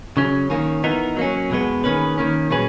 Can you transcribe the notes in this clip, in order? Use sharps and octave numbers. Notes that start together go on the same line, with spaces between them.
C#3 F#3 C#4
D#3 A#3 C#4
E3 B3 D#4 A#4
F#3 A#3 C#4
E2 B2 G#3 B3
D#3 A#3 C#4 G#4 B4
D#3 A#3 C#4
A#2 F#3 C#4 G#4 B4